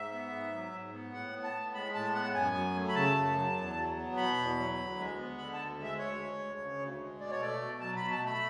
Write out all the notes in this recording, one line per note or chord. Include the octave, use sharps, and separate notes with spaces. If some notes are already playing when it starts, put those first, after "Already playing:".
Already playing: G#2 E5
B3
G#2
F#3
G#2
B3
A2 F#5
B3
A5
A2
G#3 B5
A2 A5
B3 F#5
F#2 G#5
F#3
A3
B5
C#3 A5
F#2
F#3
E2
F#3
B3
B2 B5
E2
F#3
D2
G#3
B3
D3 B5
A5
D2
G#3 E5
D2 C#5
G#3
D2
C#3
D2
G#3
B2 D5
C#5
A3 D5
B2
F#3 A5
B2 B5
A5
A3
B5